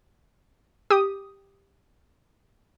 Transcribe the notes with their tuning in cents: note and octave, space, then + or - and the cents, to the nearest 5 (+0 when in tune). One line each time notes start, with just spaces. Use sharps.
G4 +5 D#6 +0